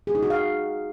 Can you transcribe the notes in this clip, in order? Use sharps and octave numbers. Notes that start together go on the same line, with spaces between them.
G#4
D#4
F#4
F5